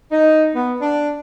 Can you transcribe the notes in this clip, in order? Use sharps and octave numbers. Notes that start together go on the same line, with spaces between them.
D#4
B3
D4